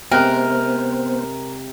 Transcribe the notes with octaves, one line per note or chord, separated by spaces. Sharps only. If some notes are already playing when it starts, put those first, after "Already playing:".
C3 G#3 B3 C4 A#4 C5 G5 F#6